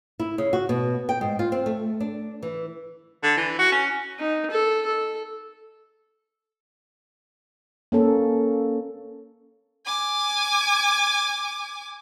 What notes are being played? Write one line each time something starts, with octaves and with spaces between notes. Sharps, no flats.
E4
C#3
F#4
B2
G5
G#2
F4
C4
A3
D4
E3
D3
E3
F#4
C#4
D#4
A4
A4
A#3 C#4 A4
G#5 D6